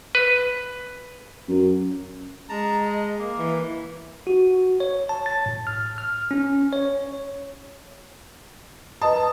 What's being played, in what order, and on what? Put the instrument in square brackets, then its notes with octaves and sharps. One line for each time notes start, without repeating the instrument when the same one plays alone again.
[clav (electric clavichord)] B4
[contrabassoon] F#2
[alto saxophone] G#3 [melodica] A5 A#5
[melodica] D#5
A#3
[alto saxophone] E3
[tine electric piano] F#4
C#5
A5
A6
A2
F6
F6
C#4
C#5
[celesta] B4 D#5 D#6 [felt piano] A5